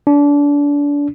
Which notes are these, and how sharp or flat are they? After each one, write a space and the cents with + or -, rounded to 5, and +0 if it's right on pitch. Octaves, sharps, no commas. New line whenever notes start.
D4 -30